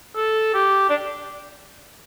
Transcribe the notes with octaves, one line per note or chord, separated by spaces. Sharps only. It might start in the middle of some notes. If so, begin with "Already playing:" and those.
A4
G4
D4